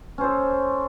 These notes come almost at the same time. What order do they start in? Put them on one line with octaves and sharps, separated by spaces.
C#4 C5 A4